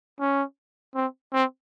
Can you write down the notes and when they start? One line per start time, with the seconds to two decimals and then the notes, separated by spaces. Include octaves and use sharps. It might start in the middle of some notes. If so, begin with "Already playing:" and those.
0.20 C#4
0.95 C4
1.33 C4